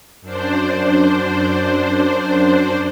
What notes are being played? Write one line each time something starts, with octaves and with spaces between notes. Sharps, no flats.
F#2 D4 C5